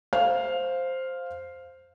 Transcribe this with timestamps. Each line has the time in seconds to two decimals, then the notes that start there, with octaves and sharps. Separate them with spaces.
0.13 C5 F5